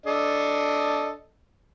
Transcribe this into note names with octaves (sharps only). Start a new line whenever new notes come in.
D4 A4 D#5